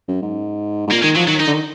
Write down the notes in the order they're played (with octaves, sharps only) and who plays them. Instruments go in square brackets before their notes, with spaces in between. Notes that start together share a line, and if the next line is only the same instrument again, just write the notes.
[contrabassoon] F#2
G#2
G#2
[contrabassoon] A#2 [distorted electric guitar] A#3
[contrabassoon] D#3 [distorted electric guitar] G#3
[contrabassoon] F3 [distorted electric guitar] F#3
[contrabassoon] D#3 [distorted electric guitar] F#3
[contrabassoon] D#3 [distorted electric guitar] D#4
[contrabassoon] D3
D#3